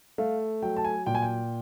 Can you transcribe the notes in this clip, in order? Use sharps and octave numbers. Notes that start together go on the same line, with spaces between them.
A3 F5
F#3 G5
A5
G#5
A#2 G5
G#5
G5